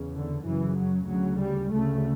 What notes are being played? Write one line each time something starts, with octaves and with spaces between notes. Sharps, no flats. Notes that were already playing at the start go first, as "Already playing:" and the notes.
Already playing: E2 C#3
D3
F#2 C#3 E3
F#3
D2 C#3 F#3
G3
D2 C#3 A3